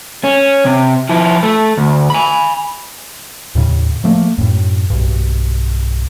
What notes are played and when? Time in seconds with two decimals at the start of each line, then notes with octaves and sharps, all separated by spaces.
0.24 C#4
0.65 C3
1.09 F3 E4
1.43 A3
1.77 D2
2.10 G#5 B5
3.55 D#2 A2 C#3
4.04 F3 A3 A#3
4.38 F#2 A2
4.90 B1 G2